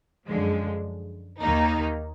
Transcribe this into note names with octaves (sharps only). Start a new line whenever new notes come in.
F#2 D3 F3 G#3
D#2 D#3 A#3 D#4